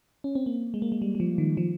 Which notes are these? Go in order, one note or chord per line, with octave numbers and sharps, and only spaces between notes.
C#4
C4
A#3
G#3
A#3
G#3
G3
G3
F3
D#3
F3